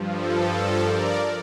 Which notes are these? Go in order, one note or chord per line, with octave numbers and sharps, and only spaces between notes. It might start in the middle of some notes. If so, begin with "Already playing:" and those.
Already playing: G2 F3
A4
A4
A#4 D5